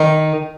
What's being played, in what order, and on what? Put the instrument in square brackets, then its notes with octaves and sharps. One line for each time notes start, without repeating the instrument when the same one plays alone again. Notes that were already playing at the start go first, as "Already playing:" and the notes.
Already playing: [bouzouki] D#3 D#4